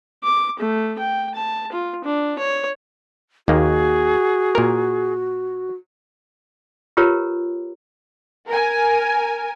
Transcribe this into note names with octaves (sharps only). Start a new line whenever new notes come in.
D6
A3
G5
A5
F4
D4
C#5
D#2 A#3 F#4 G#4
A#2 A#4
F4 G4 A#4 B4 C#5 A#5
A#4 G#5